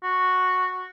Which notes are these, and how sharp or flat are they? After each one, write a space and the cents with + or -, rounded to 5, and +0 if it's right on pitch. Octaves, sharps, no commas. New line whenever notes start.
F#4 -5